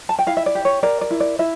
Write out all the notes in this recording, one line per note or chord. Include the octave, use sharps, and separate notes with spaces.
A5
G5
E4 F5
E5
D5
G4
C#5
A#4 D5
D5
E4
D5
E4 E5